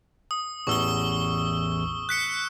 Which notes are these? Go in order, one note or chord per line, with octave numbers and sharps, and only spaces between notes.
D#6
A1 E2 C#6 E6 G7
F#6 B6 C#7